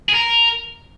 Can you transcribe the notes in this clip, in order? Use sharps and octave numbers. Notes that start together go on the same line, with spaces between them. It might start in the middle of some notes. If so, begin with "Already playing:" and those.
G#4
A#4